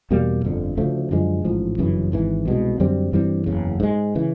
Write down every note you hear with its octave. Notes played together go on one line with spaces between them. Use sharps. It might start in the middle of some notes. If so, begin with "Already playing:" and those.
E2 B2 G3 A#3
G1 F2 D3
D2 C#3 F3 A3
F#2 D3 F3 G#3
A1 G#2 F3
G1 F#2 C#3 E3
G#1 G#2 E3
C2 B2 G#3
F#2 D3 G3 C4
G2 E3 G3 C4
F#1 E2 C#3
G#2 E3 G#3
C#3 E3